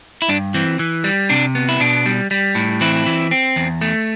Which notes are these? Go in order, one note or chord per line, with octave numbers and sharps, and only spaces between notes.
E4
G2 D4
E3 C4
E3
G3
C3 D4
B3
E4
B2 D4
G3
G3
A2
E3 C4 E4
E3
C4
E2
A3